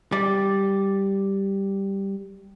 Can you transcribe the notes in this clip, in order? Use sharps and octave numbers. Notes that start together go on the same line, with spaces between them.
G3 D5